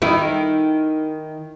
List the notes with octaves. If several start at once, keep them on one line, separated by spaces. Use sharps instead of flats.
D#3 E4